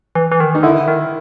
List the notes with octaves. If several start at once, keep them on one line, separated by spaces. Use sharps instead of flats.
E3
E3
D#3
D#4
D3 E4
D#3